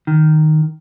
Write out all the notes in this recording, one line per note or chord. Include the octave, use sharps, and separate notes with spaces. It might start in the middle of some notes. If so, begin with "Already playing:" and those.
D#3